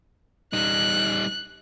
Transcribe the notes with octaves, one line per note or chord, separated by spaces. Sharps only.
G3 D#4 F#6